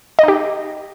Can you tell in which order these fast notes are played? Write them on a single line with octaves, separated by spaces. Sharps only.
D#5 D#4 G4